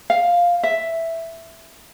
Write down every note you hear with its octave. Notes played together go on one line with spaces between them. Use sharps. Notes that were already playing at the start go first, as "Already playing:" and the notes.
F5
E5